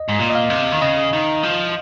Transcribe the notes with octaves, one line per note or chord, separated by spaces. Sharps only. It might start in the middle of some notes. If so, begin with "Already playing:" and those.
Already playing: D#5
G#2
A#2
D#5
F5
C3
D#3
C#3 D#5
D#3
F3